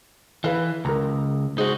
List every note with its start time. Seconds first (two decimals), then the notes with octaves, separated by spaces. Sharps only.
0.44 E3 B4 F5
0.85 C#2 A#4 A#5
1.58 G#3 D#4 F#4 C5